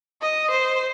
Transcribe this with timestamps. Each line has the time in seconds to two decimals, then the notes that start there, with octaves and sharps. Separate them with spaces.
0.21 D#5
0.50 C5